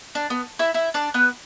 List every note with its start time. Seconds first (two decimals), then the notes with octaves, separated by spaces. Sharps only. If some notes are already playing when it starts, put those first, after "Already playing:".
0.15 D4
0.30 B3
0.59 E4 E5
0.74 E4 E5
0.94 D4 D5
1.14 B3 B4